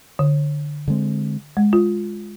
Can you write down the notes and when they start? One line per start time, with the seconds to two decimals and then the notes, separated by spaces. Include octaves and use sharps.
0.19 D3
0.88 D3 G#3 C4
1.57 G#3
1.73 F4